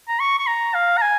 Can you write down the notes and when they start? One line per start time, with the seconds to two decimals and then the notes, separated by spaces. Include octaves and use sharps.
0.08 A#5
0.20 C#6
0.38 C#6
0.47 A#5
0.75 F5
0.97 A#5
1.02 G#5